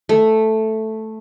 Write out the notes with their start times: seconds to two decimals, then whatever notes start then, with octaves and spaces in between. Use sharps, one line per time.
0.09 A3